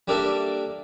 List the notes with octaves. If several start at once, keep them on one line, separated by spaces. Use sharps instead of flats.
G3 A#3 D4 A4 E5